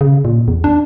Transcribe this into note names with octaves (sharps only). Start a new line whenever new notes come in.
C#3
A#2
E2
D4